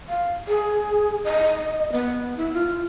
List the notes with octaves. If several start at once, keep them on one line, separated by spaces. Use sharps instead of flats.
F5
G#4
D#5
B3
E4
F4